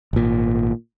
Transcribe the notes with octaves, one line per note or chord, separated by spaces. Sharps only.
G#1 A#2